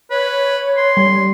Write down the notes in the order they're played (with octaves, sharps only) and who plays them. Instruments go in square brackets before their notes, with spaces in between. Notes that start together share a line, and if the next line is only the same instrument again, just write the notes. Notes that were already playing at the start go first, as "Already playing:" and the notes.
[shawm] B4 [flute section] C#5
[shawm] C6
[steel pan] G3